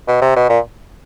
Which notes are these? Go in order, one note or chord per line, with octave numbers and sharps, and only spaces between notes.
B2
C3
B2
A#2